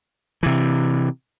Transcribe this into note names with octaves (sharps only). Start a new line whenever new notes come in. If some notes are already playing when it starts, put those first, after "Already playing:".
C3 E3